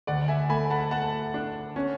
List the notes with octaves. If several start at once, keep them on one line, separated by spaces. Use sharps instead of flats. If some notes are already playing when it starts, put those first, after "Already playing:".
D2 D5 F#5
E5 G#5
A3 G#5 B5
F#5 A5
A3 F#5 A5
D4
C#4